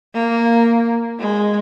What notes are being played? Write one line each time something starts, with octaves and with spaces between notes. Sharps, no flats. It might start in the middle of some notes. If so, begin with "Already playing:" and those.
A#3
G#3